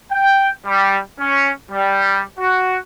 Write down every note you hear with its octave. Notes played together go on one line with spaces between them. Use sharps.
G5
G3
C#4
G3
F#4